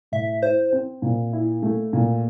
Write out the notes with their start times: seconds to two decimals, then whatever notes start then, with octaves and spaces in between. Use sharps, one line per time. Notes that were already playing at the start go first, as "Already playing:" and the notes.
0.12 A2 E5
0.42 E4 C5
0.72 C4
1.02 A#2
1.33 E4
1.62 A3
1.93 A#2